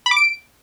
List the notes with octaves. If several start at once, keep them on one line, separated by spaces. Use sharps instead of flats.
B5
D6
D7